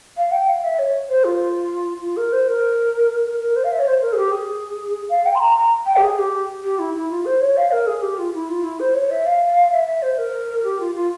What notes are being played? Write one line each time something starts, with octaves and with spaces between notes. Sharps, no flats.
F5
G5
F5
E5
C#5
C5
F4
F4
A#4
C5
A#4
A#4
A#4
C5
F5
E5
C#5
C5
A#4
G#4
G4
G#4
F5
G5
C6
A#5
A#5
G5
G4
G#4
G4
G4
E4
E4
F4
C5
C#5
F5
A#4
G#4
G4
F4
E4
F4
E4
C5
C#5
E5
F5
E5
E5
C5
A#4
G4
F4
F4